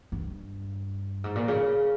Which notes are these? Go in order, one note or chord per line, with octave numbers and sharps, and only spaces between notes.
G2
G#2
A#2
C#3